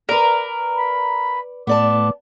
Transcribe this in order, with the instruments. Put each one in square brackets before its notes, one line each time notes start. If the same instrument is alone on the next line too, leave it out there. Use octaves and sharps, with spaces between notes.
[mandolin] A#4 [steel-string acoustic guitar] B4 D5
[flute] B5
[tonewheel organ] A2 [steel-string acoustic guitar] B3 D5 A5 [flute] D6